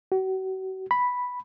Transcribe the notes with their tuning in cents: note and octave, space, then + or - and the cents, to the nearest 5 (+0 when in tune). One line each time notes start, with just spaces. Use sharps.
F#4 +40
B5 +0